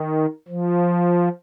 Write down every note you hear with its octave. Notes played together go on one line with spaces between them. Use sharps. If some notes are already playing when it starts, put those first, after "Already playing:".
Already playing: D#3
F3